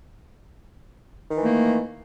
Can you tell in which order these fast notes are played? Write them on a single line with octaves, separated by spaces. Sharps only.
D#3 E3 A3 A#3